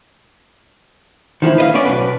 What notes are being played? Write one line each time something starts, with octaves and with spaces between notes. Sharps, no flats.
D#3 F3 A#3 E4
B4 D#5 F5
B3 C#4 D5
B1 F#2 B4